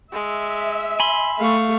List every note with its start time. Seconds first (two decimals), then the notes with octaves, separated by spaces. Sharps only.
0.13 G#3 E5
1.00 G#5 B5 C6
1.40 A3 F5 C#6